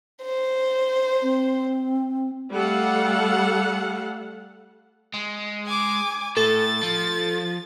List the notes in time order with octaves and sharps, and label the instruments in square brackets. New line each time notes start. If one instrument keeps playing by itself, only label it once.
[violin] C5
[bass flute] C4
[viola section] G3 A3 A4 F5 F#5
[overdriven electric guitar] G#3
[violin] G#5 D6
[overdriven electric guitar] A2 [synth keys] A4 [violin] A6
[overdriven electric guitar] F3